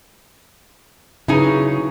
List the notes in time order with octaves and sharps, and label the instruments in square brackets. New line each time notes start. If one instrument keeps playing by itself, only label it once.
[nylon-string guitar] C#3 [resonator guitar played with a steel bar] F#3 D#4 G#5 [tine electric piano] E4 G#4 B4